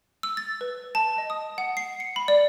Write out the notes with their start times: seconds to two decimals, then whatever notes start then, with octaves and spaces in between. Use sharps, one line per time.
0.23 E6
0.37 A6
0.61 B4
0.95 A5
1.18 D#5
1.30 D#6
1.58 F#5
1.77 C7
2.00 C#7
2.16 B5
2.28 D5